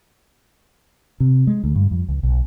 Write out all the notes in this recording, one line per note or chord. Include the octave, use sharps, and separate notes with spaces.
C3
G#3
D2
G2
F2
C#2
B1